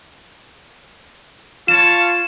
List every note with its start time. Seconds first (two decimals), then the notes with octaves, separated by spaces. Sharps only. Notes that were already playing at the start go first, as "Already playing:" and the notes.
1.68 F4 C#5 F5 A5 E7